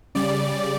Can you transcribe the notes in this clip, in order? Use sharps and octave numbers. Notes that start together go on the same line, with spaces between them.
C#3 G3 D5